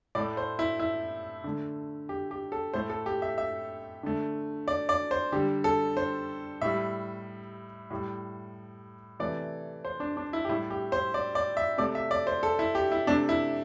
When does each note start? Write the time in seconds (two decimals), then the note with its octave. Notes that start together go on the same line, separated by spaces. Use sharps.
0.15 A2 A3 D5
0.37 C5
0.59 E4
0.79 E4
1.44 D3 A3
2.09 G4
2.31 G4
2.52 A4
2.74 A2 A3 C5
2.90 A4
3.06 G4
3.22 E5
3.38 E5
4.03 D3 A3
4.68 D5
4.89 D5
5.11 C5
5.32 D3 G3 G4
5.64 A4
5.97 C5
6.61 A2 G3 E5
7.90 A2 G3
9.20 C3 E3 A3 D5
9.85 C5
10.00 D4
10.17 D4
10.33 E4
10.45 G4
10.49 A2 G3 E4
10.71 G4
10.92 C5
11.14 D5
11.35 D5
11.57 E5
11.78 C3 A3 D5
11.95 E5
12.11 D5
12.27 C5
12.43 A4
12.59 E4
12.75 G4
12.92 E4
13.07 C3 A3 D4
13.29 E4